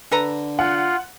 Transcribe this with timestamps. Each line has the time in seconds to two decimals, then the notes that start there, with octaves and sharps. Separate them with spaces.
0.12 D3 A4 B4 A#5
0.59 F4 F#5